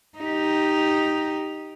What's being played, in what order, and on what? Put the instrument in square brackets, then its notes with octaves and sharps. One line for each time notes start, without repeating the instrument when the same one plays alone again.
[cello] D#4 G4